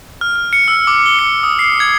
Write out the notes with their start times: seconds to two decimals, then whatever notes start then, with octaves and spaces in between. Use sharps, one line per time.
0.21 F6
0.36 F6
0.53 C#7
0.68 E6
0.87 D6
1.06 G7
1.19 C#7
1.43 D#6
1.59 C7
1.80 G#6